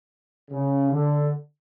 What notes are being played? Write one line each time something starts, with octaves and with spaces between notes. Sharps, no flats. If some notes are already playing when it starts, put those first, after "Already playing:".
C#3
D3